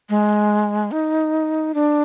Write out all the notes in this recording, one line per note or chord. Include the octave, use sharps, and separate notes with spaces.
G#3
D#4
D4